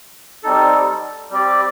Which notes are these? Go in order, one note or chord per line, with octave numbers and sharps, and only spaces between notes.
G3 C4 D#4 A4
G3 C4 G4 D5